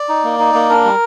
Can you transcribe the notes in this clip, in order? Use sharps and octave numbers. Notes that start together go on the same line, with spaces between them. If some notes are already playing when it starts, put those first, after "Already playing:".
Already playing: D5
D#4
A#3
D#4
A#3
D4 A#4
G3